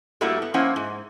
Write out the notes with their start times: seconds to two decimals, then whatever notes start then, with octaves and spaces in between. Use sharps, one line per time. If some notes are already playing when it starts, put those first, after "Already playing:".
0.21 G2 G3 A3 A#3 E4 F#4
0.42 B3
0.54 F3 A#3 C#4 E4 C5 F#5
0.76 G#2